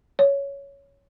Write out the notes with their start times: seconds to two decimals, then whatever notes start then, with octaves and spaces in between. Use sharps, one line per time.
0.19 C#5